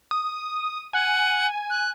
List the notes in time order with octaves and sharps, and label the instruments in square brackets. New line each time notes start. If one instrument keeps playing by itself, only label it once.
[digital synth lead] D#6
[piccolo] F#5 [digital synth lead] G#5
[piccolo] F#6